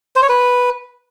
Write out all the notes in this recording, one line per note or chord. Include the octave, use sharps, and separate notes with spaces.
C5
C#5
B4